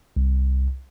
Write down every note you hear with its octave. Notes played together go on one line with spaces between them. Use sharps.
C2